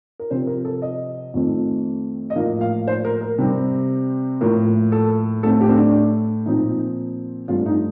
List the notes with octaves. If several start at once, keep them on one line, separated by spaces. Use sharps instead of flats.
A#4
C3 F3 C4 C5
A#4
A4
D#5
F2 D#3 A3 C4
D#5
A2 F3 A#3 F5
F5
C5
A#4
A#4
C3 G3 C4
A2 F3 A#3 A#4
A4
A2 A3 C4 A4
G4
C4
D4
A#2 F3 C4 D#4
G2 F3 A3 C4 F4
D#4